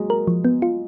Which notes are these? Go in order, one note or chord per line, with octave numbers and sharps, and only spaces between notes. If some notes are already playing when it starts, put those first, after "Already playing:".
Already playing: F#3 G#3 A#3
A#4
F3
B3
F4